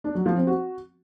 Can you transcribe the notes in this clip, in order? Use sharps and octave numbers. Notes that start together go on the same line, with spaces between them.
D4
F#3
F3
C4
F#4